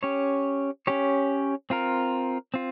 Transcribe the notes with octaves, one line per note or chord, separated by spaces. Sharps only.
C#4 G4 C#5
C#4 G4 C#5
C4 F4 A#4
C4 F4